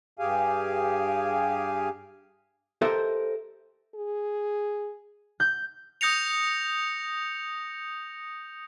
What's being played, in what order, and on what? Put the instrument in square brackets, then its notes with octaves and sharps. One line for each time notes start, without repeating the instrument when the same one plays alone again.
[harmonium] G2 G4 G#4 F5 G#5
[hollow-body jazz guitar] G4 A4 A#4 C5 D#5 E5
[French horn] G#4
[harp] G6
[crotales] D#6 G6 A#6 C#7 F7